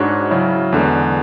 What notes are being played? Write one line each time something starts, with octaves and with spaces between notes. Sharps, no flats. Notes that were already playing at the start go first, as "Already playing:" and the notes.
Already playing: G#2 G#3 D4 F#4 C#5
C#3 F#3 C#4 E4
E2 D3 G#3